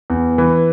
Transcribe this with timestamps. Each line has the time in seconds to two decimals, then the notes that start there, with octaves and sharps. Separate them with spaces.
0.10 E2
0.38 E3